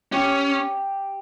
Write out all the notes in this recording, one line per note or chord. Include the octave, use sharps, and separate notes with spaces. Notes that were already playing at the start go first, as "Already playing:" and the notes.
C#4 G4